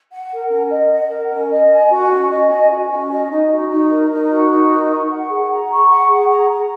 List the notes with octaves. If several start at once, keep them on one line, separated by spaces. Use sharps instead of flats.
F#5
A#4
C#4
D#5
F#5
A#4
C#4
D#5
G#5
F#4
C#4
D#5
G#5
F#4
C#4
D#5
D#4
F#4
D#4
A#4
D#4
F#4
D#4
A#4
C#6
F#5
G#4
A#5
C#6
F#5
G#4
A#5
A#5